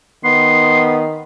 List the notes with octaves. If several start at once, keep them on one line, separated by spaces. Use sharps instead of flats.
D#3 B3 C6